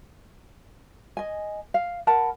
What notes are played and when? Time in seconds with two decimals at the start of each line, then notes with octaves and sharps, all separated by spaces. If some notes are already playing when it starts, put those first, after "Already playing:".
1.17 D#5 G#5
1.74 F5
2.07 A#4 F#5 A5 B5